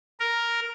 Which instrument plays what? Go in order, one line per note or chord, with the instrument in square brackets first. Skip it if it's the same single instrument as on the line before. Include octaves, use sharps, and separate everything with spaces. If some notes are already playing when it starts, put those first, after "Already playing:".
[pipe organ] A#4